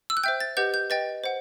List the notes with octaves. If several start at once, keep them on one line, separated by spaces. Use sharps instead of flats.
E6
F#6
C5 E5 G5 G6
A6
G4 B4 D#5 F#5 G6
G6
B4 D#5 G5 A6
C5 F#5